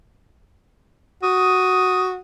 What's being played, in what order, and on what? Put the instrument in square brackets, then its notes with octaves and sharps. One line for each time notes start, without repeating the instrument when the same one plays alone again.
[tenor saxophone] F#4 [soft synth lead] D#6